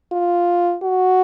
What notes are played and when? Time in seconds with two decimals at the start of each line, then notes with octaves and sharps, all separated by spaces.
0.12 F4
0.83 F#4